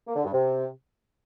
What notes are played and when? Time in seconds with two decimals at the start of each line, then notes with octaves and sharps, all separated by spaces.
0.07 A#3
0.16 D3
0.24 G2
0.33 C3